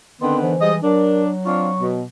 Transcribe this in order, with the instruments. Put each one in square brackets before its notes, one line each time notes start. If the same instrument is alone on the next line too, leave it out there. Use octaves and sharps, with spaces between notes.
[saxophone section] D3 D#3 B3 [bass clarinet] C4 [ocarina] C6
[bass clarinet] E3 [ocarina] C5
[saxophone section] G3 G#3 D#5
[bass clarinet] F#3 [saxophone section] D4 [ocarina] A#4
[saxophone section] C4 D4 F4 [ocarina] C#6
[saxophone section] B2